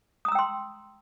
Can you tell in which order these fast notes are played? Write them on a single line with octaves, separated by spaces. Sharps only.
D#6 A#5 E6 G5 C6